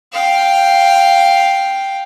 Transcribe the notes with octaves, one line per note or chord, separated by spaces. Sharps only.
F5 G5